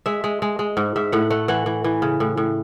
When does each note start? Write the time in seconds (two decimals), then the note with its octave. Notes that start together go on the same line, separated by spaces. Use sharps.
0.06 G#3 E5
0.24 G#3
0.42 G#3
0.59 G#3
0.77 G#2
0.96 G#2 E5
1.12 A2 F#5
1.30 A3 F#5
1.48 E3 F#5
1.66 E3
1.84 E3
2.02 C#3
2.20 A2
2.37 A2